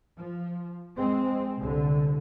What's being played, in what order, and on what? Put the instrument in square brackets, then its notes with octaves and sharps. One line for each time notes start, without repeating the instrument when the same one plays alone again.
[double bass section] F3
G#3 C4
C2 D3